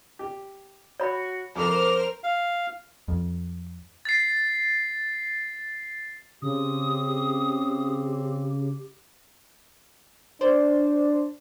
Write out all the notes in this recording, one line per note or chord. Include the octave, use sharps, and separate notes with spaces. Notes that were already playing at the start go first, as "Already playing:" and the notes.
G4
F#4 C#5 B5
F2 A4 A#4 C5 A#5 D6 F6
F5
F2
A6 C7
C#3 C4 G4 D#6
D4 C5 D5